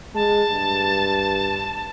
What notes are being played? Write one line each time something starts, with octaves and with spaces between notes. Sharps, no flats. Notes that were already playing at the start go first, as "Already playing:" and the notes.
G#3 A5
G2